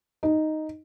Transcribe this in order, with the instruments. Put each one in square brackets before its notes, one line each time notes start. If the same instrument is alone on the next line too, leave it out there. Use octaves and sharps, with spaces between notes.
[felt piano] D#4